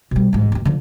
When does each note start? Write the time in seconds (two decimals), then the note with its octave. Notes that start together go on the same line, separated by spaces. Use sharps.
0.11 B2 G3
0.33 A1 G#2
0.52 D#2 C#4
0.65 D3 F3